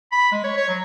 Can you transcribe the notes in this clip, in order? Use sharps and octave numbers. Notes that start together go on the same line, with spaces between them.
B5
G#3
C#5
C#5
F#3